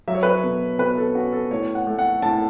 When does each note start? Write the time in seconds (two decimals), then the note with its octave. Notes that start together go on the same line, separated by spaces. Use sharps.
0.08 F#3 E5
0.15 C#5
0.23 B4
0.31 C#5
0.43 B2
0.79 B2 B4
0.97 A4
1.15 C#4 F#4
1.33 A4
1.51 A2 C#5
1.75 F#5
1.87 A3
1.99 F#5
2.22 A2 A5